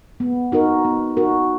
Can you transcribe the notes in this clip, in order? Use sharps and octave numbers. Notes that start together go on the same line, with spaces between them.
B3
D#4 F#4 A#4
B3
D#4 F#4 A#4